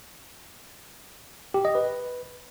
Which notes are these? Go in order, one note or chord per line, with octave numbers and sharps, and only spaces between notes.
G4
D#5
B4